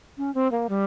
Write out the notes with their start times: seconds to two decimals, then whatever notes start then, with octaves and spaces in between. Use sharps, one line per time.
0.18 C#4
0.35 C4
0.52 A#3
0.69 G3